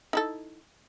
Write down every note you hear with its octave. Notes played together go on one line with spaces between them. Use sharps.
D#4 E4 A4